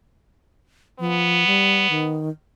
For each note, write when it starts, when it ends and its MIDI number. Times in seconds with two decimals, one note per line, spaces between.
0.99 1.47 53
0.99 2.23 59
1.47 1.87 55
1.90 2.30 51